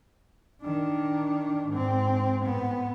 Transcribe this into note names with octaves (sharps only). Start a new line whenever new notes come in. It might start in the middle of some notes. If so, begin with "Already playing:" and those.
D#3 D4
G#2 C4
A2 B3